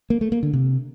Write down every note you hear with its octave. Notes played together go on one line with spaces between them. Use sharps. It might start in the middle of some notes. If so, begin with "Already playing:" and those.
A#3
A3
A#3
D3
C3